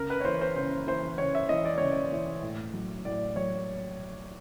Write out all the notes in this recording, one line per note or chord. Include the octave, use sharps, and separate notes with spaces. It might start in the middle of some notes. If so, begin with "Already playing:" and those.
Already playing: C#3 A#4
B4
C#5
E3 C5
C5
C#3 C5
E3 C5
C#3 C#5
E5
E3 D#5
D5
C#3 C#5
D5
E3
A2
F#3
A2 D5
F#3 C#5